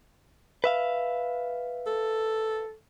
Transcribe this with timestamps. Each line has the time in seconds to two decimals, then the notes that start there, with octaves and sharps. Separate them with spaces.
0.64 B4 E5 F5
1.86 A4